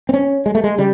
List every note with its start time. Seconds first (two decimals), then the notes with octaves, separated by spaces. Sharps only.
0.09 C4
0.14 C#4
0.46 G#3
0.55 A3
0.64 G#3
0.78 C#3 G3